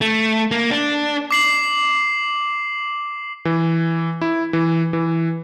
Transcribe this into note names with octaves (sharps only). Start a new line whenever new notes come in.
A3
A#3
D4
D6 C7 F#7
E3
E4
E3
E3